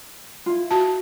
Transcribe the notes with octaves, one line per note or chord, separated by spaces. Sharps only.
E4 F4
F#4 A5